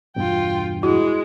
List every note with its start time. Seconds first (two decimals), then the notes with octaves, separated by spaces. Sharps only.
0.16 E2 G2 B2 F4 G5
0.83 G#3 E4 F#4